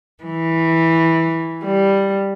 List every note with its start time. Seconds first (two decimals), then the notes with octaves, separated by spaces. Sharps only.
0.23 E3
1.64 G3